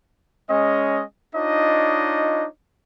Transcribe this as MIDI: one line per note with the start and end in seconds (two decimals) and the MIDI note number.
0.49 1.02 56
0.49 1.02 61
0.49 1.02 75
1.35 2.46 62
1.35 2.46 63
1.35 2.46 65
1.35 2.46 73
1.35 2.46 75